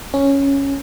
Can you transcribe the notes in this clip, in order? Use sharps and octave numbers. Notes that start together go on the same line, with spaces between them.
C#4